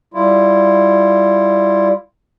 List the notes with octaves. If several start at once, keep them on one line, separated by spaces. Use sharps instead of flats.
G3 E4 F4